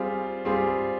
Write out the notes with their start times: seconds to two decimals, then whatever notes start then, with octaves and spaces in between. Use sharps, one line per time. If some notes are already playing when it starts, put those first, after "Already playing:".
Already playing: G3 C4 F4 G#4
0.45 G3 C4 F4 G#4